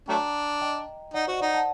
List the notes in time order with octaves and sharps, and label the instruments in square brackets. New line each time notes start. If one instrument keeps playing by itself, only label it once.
[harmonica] F#3 A3 D4 [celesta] G5 A#5
[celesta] D#5 G5
[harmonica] D#4 [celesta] D5 F#5
[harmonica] F#4 [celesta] C5 D#5
[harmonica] D#4 [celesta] D5 F#5
[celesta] F#5 A5